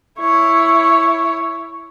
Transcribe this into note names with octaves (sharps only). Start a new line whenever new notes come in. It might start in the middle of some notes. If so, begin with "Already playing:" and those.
E4 C#5